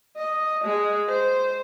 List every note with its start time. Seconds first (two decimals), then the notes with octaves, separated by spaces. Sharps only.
0.17 D#5
0.65 G#3
1.09 C5